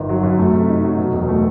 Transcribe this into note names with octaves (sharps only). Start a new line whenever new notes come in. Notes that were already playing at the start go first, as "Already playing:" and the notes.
Already playing: G1 D#3
F#3
F#2
A3
C3
D#4
F#3
B2
E1
A3